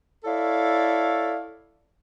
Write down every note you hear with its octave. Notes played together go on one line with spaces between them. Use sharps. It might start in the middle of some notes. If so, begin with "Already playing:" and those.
E4 A4 C#5 D5 F5